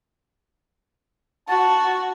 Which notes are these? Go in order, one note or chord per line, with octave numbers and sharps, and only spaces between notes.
F#4 A5